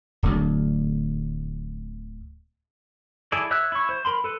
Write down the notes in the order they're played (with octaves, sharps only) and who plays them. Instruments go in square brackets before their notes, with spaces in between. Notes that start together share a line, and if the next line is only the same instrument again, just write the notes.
[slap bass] D1 D2
[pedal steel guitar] E4 G#4 A4 D5
C#5 E5 E6 F#6
E4 C#6
C5
A#4 B5 C6
A4 B4